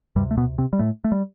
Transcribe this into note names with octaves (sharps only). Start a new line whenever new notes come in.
D2 G2 C3 G3
A3
B2 B3
C3 C4
G3
A2 A3
A3
G3